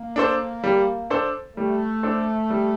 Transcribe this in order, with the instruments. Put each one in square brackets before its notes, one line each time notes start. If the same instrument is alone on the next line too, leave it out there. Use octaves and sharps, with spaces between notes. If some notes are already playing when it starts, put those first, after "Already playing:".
Already playing: [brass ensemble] A#3
[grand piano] D4 A4 C5
G3
D4 A4 C5
[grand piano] G3 [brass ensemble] A3
[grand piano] D4 A4 C5
G3